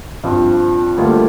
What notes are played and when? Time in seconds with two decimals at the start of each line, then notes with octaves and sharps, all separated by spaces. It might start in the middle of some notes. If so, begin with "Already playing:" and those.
0.24 G2 F3 C4
0.97 D2 D3 G3 A#3 F4